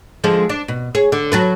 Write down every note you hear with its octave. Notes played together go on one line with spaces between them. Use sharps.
D3 F3 G#3
D4
B2
G#4 C#5
D3
F#3 A4 B4